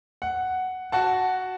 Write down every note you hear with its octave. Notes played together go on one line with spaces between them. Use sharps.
F#5
F#4 F#5 A5